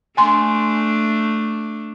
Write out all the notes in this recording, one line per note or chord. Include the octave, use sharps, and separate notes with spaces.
A3 D4 G#5 C6